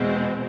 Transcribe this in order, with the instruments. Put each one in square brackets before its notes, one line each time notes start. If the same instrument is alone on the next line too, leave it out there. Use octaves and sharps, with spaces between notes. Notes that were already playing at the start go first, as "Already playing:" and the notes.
Already playing: [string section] E2 B2 G#3 C4